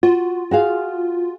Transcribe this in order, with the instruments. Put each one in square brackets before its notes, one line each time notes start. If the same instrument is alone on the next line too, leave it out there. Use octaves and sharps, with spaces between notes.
[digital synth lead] F4 [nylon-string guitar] F#4
[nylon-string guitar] F#4 G#4 F5